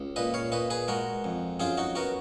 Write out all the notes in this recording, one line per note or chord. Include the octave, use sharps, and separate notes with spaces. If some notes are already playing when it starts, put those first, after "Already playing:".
Already playing: C#2
A#2 B4 D#5
C#5 F5
A#2 B4 D#5
G#4 B4
G#3 F#4 A#4
F2
F#2 F4 G#4
D#4 F#4
B3 F#4 A#4